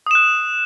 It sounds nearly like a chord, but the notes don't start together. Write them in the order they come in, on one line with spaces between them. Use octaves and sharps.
D#6 E7 F#6